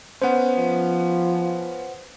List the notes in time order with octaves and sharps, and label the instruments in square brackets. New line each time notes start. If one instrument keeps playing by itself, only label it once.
[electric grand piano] B3 C#4 [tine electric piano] C5 F#5
[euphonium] F3